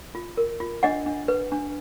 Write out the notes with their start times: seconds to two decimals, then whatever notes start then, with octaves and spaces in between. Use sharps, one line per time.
0.15 F4
0.37 A#4
0.60 F4
0.83 D4 D#5 F#5
1.06 D4
1.28 B4
1.52 D4